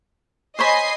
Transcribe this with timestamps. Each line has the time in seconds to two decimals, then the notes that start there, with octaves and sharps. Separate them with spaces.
0.59 C5 C#5 D#5 G#5 B5 C7